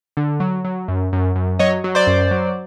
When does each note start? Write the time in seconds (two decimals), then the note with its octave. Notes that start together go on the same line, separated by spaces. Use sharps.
0.17 D3
0.40 F#3
0.65 F#3
0.88 F#2
1.13 F#2
1.35 F#2
1.59 F#3 C#5 D#5
1.84 F#3
1.95 C5 D5
2.07 F#2
2.31 F#3